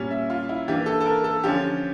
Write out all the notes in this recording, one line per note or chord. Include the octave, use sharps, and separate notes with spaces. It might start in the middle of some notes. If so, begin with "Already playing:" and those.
Already playing: A#2 G3 C#4
E5
F4
E4
E3 A#3 D4 G4
A4
A4
A#4
A4
D3 F3 C#4 G4